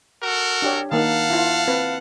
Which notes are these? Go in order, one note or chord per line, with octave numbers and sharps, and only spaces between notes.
F#4 A4 A#4
D4 G4 C#5
D#3 A#3 D#4 F5 F#5 A5
E4 F4
C4 B4